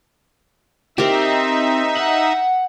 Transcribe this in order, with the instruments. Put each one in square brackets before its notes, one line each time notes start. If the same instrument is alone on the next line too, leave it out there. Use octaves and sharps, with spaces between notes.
[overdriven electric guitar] C4 [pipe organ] D#4 E5 [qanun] G4 A#4
[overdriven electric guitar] F#5